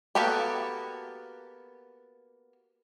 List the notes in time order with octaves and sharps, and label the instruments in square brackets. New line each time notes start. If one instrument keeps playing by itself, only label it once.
[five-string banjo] A#3 B3 F#4 G4 A4